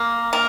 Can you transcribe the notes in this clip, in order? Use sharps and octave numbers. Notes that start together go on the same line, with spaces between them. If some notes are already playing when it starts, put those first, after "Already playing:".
Already playing: A#3
A#3